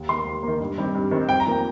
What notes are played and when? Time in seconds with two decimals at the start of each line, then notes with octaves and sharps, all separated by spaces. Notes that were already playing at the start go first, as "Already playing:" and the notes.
Already playing: D#2
0.09 D#3 A#3 C6
0.25 D#2
0.43 D#3 A#3
0.60 G2
0.78 D#3 G3 C4
0.94 G2
1.11 D#3 G3 C4
1.29 F2 G5
1.40 A#5
1.47 F3 A#3 G5